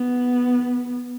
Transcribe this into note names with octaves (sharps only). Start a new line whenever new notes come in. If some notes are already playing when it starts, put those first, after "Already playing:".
Already playing: B3